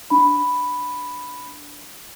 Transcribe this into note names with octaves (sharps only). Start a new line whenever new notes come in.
D4 B5